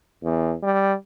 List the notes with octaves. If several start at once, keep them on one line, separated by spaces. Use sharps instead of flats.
E2
G3